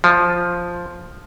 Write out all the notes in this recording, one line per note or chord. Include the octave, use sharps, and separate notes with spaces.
F3